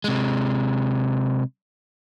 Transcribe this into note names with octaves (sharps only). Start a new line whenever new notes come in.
C3 G#3